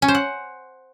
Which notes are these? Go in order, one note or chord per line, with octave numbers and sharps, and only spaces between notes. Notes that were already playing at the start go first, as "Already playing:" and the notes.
C#4
C5
F#5